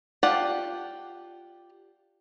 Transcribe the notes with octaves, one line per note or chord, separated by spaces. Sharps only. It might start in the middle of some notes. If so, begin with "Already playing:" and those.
F4 G4 D5 F#5 A5